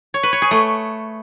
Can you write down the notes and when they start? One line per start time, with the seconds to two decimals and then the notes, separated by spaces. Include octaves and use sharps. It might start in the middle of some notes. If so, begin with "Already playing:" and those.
0.14 C#5
0.23 B4
0.33 C#5
0.42 G#4
0.51 A3